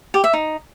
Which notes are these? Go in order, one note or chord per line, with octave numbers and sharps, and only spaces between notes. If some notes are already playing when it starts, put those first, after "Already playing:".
G4
E5
D#4